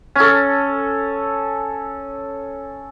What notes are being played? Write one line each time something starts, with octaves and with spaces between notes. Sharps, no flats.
C#4 A4